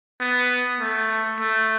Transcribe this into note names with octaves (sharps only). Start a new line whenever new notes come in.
B3
A3
A3